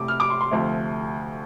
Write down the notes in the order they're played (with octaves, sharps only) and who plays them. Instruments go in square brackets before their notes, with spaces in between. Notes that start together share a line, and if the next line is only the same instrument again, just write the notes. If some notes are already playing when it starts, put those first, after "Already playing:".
Already playing: [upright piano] C2 C3 A3 D6
F6
D6
C6
C6
D2 C3 F3 A3